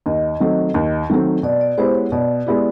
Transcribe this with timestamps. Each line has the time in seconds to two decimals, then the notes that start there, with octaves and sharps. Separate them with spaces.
0.06 D#2 D#5
0.40 D#3 F#3 A3 C4
0.74 D#2
1.10 D#3 F#3 A3 C4
1.43 B2 D5
1.61 D5
1.78 G#3 B3 E4 G4 C5
1.95 C#5
2.12 B2 D5
2.47 G#3 B3 E4 G4